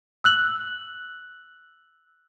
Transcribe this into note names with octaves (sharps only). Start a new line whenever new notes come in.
E6 F#6 F#7